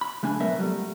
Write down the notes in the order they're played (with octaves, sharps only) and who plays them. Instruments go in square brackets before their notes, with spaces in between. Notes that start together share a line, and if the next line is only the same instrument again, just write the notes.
[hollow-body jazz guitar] B5
C#3 A3 D4 G#5
B1 F#3 B3 A#4 E5
A#2 F#3 G3 A3